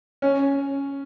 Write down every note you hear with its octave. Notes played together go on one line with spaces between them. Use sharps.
C#4